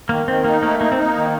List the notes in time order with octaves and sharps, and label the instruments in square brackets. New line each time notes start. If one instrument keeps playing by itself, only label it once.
[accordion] D#3 [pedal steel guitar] A#3
[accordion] D#3 [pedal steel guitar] C4
[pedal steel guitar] A#3 [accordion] D#4
[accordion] A3 [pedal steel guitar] A#3
[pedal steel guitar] A#3 [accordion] D#4
[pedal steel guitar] C4
[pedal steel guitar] A#3 [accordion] D#4
[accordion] D#3